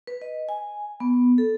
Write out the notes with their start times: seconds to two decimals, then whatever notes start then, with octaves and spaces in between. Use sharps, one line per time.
0.07 B4
0.22 D#5
0.49 G#5
1.00 B3
1.38 A4